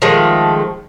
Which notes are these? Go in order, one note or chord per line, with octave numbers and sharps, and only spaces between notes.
D#3 F3 G#3 A3